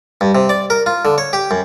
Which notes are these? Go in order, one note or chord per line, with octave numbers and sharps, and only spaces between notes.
G2
C3
D5
A#4
F4
D3
C#5
G4
F#2